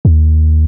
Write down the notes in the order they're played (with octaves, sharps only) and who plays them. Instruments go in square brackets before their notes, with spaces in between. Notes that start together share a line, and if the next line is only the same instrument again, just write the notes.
[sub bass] D#2